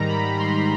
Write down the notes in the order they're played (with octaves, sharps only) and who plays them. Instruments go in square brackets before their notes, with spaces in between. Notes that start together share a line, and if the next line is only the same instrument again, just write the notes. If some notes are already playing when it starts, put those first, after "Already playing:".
Already playing: [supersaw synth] G#2 D#3 G3 A#5
B5
C6